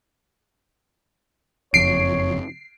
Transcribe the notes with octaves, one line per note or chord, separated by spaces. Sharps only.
F#1 F2 C#5 C7 D7